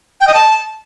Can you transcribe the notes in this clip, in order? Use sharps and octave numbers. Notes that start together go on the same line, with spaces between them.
G5
D#5
A5